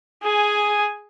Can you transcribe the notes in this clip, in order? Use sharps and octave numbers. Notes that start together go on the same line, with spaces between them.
G#4 G#5